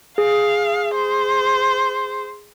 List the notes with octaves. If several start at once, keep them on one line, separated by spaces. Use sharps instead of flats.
G#4 F5
C5